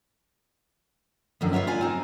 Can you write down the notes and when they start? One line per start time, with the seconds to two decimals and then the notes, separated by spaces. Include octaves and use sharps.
1.41 F#2 D3 D#3 F3
1.53 F4 B4 C#5 E5
1.67 F4 D5 G#5
1.81 C4 D#4